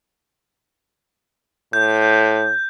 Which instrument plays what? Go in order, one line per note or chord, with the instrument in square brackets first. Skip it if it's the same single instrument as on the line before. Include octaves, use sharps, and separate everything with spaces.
[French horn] A2 [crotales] G6